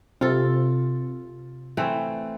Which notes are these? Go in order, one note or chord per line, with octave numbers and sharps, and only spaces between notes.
C3 F4 A4
E3 A3 C4